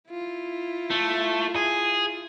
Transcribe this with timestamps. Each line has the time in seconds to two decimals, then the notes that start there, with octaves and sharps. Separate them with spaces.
0.11 E4 F4
0.90 A3
1.56 G#4